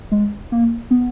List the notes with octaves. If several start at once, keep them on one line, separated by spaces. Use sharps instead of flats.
G#3
A#3
B3